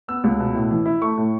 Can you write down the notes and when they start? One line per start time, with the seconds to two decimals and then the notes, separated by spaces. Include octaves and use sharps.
0.08 B3 E6
0.24 C#2
0.40 B2
0.54 A2
0.71 E3
0.86 E4
1.02 A3 C#6
1.17 A2